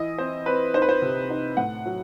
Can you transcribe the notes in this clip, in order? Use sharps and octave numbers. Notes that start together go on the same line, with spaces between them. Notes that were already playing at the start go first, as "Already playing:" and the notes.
Already playing: E3 E4 D#5
C4 C5
C4 B4
D#4 C5
B4
C5
C3
D#4
A2 F#5
F#3